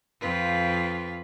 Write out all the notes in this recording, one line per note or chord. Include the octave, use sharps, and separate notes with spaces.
F2 F4 B4